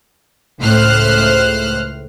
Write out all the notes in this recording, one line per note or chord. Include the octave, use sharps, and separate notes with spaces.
C#2 A2 C5 F6 F#6